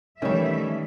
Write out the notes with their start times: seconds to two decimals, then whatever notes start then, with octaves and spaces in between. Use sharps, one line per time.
0.22 D#3 E3 G3 A3 C#4 E5